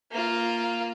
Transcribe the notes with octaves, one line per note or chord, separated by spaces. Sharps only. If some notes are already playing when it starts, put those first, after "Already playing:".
A#3 F4